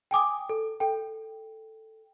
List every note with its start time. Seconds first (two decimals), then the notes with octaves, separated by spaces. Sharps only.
0.11 G5 G#5 D6 D#6
0.49 A4
0.80 A4 G5